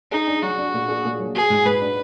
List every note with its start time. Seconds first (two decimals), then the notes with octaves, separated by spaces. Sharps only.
0.12 D#4 G#4
0.27 D4
0.42 F#3 F#4
0.58 D4
0.74 A#2
0.89 G#4
1.05 A#2
1.19 F#3
1.35 F#4 G#4
1.50 G#2
1.65 G#2 B4
1.81 D4